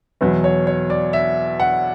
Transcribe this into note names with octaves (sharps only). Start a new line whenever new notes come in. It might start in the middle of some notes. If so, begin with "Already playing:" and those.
E2 B2 F#3 B4
C#5
C#5
D5
E5
F#5